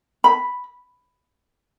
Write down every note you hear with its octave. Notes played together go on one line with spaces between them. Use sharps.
B5